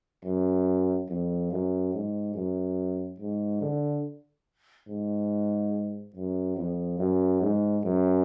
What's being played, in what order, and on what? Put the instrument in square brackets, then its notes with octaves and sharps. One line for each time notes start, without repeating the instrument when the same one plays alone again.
[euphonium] F#2
F2
F#2
G#2
F#2
G#2
D3
G#2
F#2
F2
F#2
G#2
F#2